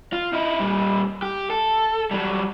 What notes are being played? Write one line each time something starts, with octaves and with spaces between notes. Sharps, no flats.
F4
D#4 E4
A#2 G3
G4
A4
F#3 G3